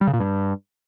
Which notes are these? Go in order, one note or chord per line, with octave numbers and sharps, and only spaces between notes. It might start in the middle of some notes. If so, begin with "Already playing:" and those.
G3
C#3
A#2
G2